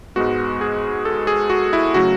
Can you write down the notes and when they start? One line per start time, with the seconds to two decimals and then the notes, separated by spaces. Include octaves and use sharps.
0.16 G#2 G#3 B3 F#4
0.61 G#4
1.05 A4
1.27 G#4
1.50 F#4
1.73 E4
1.94 C#3 F#3 A3 F#4